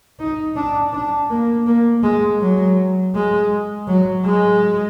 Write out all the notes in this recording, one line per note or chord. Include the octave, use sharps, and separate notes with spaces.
D#4
D4
D4
A#3
A#3
G#3
F#3
G#3
F#3
G#3